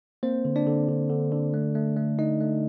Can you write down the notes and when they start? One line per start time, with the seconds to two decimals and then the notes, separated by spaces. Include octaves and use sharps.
0.23 A#3 C4 C5
0.45 D3
0.56 D4 D5
0.67 D3
0.88 D3
1.10 D3
1.32 D3
1.54 A3
1.75 A3
1.97 A3
2.19 A3 D#4 D#5
2.41 A3